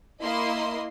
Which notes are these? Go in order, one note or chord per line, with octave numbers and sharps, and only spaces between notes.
A#3 E4 D#5 C6